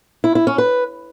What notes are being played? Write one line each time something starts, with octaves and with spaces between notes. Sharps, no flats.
E4
E4
C#4
B4